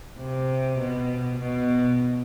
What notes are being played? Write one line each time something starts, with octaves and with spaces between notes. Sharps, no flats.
C3
B2
B2